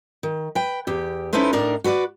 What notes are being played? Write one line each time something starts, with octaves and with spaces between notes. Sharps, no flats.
D#3
B4 G5
E2 G4
C#4 D#4 E4 A4 B4 C5
A2 D4 D#4 A#4 D5
F#4 B4 C5 D5